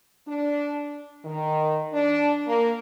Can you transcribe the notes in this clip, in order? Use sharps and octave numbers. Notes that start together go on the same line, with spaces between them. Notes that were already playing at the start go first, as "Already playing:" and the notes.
D4
D#3
D4
A#3